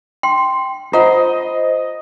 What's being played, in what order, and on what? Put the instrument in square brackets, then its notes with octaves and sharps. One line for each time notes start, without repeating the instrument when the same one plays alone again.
[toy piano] G5 C6
[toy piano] F4 F#5 A#5 [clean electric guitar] C5 [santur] D#5